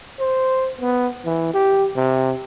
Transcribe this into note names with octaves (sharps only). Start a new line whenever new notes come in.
C5
B3
E3
G4
C3